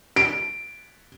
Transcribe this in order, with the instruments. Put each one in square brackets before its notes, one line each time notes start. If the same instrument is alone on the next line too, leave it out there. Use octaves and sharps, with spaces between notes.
[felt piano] D7